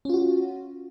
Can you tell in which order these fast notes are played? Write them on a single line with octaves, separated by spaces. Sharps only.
C#4 F4 F#4